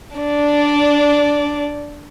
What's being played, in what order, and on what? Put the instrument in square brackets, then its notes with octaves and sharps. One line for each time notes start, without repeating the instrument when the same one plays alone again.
[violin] D4 D5